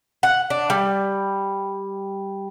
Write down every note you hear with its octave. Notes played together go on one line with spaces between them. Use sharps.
F#5
D4
G3